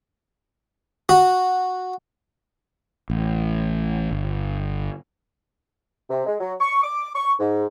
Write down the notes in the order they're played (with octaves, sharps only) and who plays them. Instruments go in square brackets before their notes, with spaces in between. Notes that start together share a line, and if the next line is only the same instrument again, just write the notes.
[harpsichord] F#4
[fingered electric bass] A1
G1
[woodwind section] C3
G#3
F#3
C#6
D6
C#6
G#2